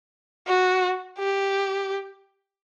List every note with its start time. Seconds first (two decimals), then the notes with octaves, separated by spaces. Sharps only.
0.47 F#4
1.19 G4